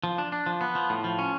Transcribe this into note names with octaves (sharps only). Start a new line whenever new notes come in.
F3
D4
D4
F3
B3
F3
A2
F3
C#4